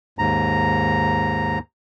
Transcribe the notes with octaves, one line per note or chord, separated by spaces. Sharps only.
D#2 G#2 A#5